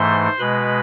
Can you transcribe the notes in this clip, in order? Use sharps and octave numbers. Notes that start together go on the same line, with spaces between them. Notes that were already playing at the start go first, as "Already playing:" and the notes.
Already playing: G#2 E3 A3 C5 C6
B2 G#3 B4 B5